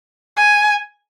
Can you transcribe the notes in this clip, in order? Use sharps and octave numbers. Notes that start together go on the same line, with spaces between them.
G#5